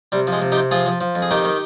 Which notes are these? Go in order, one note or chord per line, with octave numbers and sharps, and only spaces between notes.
C3 G3
F3
G#3
C3
D#4 G4
C3
F3 F4 G#4
F3
F3
F2
G#4
D#3 D#4 G4
D#3